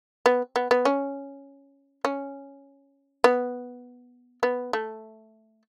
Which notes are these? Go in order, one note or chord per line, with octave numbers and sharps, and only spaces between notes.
B3
B3
B3
C#4
C#4
B3
B3
A3